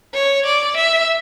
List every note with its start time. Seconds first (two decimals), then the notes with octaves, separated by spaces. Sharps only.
0.14 C#5
0.46 D5
0.77 E5